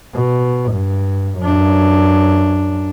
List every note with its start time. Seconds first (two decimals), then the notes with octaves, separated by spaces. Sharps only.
0.15 B2
0.73 G2
1.39 F#2 D4